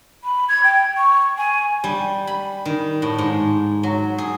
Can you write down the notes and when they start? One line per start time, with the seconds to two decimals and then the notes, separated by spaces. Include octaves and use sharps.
0.24 B5
0.49 G#6
0.64 G5
0.97 C#6
1.38 G#5
1.84 G3
2.27 B5
2.65 D#3
3.02 A2
3.18 G#2
3.83 F#3
4.18 G#4